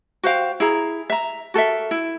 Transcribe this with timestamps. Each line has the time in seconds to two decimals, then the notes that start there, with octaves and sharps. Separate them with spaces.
0.23 F#4 C5 F5 G5
0.60 E4 G#4 A#5
1.10 E5 A#5
1.54 F#4 A4 A#4 E5
1.91 E4